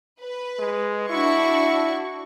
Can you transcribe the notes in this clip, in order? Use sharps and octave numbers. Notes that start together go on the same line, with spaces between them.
B4
G#3
D4 E4 F#4 C#6